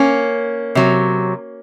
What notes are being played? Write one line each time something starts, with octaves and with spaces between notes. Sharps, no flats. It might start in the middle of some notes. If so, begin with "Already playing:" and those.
Already playing: A#3 C#4
C3 F#3